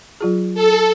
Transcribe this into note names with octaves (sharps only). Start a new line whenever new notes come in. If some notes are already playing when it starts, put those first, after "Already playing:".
F#3 F4 G#4
A4